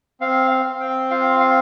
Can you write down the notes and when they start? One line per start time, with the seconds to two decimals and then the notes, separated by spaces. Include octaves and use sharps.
0.21 C4 F5
0.51 F5
0.66 C4
0.80 G5
1.11 F4 F5
1.40 F5